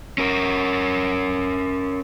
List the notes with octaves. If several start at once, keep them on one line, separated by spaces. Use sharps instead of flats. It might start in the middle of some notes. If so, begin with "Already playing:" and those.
C#4 A#4